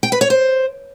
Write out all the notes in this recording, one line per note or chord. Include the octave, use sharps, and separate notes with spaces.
G5
B4
C#5
C5